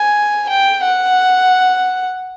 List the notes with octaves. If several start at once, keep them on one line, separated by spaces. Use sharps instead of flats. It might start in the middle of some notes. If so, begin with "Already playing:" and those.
Already playing: G#5
G5
F#5